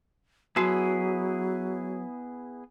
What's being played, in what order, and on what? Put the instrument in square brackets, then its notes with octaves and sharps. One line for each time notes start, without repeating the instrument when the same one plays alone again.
[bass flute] F#3 [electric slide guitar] B3 E4 G#4 [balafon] F#4 A5